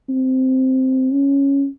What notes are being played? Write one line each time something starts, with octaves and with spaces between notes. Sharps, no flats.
C4
C#4